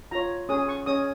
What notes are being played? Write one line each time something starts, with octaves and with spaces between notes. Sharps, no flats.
F4 C#5 A#5
C#4 G#4 C#5 D#6
C#6
C#4 G#4 C#5 D#6